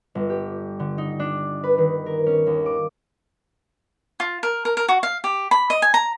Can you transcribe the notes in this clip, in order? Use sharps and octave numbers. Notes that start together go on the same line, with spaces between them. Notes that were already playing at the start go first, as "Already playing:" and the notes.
G1
G4
D3
D#4
D4
B4
D#3
A#4
C#4
D#2
D6
F4
A#4
A#4
A#4
F#4
F5
G4
B5
D#5
G#5
A#5